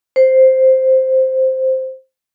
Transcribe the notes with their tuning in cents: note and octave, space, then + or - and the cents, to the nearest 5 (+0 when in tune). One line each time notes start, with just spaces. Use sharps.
C5 +0